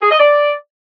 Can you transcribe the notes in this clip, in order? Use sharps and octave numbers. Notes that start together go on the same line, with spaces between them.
G#4
D#5
D5